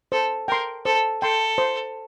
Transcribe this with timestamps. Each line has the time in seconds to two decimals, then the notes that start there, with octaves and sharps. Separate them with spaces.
0.12 A4 C5
0.48 A#4 G5 C6
0.85 A4 C5
1.22 A4 G5 C6
1.58 C5